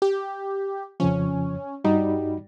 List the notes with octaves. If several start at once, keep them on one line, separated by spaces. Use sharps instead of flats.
G4
F2 C#3 F3 C#4
G2 G3 D#4 F#4